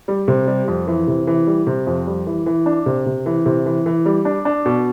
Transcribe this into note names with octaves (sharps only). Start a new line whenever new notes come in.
G3
C3
G3
F2
E3
C3
E3
G3
C3
F2
G3
E3
E3
D4
C3
C3
E3
C3
E3
E3
G3
D4
D4
B2